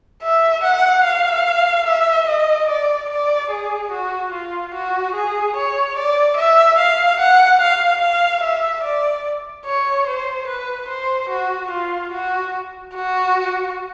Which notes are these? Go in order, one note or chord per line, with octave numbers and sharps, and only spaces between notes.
E5
F#5
F5
E5
D#5
D5
D5
G#4
F#4
F4
F#4
G#4
C#5
D5
E5
F5
F#5
F5
F5
E5
D5
C#5
C5
B4
C5
F#4
F4
F#4
F#4